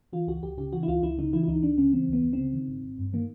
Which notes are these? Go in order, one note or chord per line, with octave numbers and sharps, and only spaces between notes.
E3 F4
C#2 F#4
C#2 G4
C#3 G4
E3 F#4
E4
C#2 F4
C#2 E4
C#3 D#4
E3 E4
E4
C#2 D#4
C#2 D4
C#3 C#4
E3 C4
C#2 B3
C#2
C#3 C4
D#3
G#1
G#1
G2
D#3 A#3